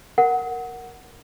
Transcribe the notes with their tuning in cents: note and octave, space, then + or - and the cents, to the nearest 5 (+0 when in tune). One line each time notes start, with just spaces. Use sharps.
A#4 +0 F#5 +0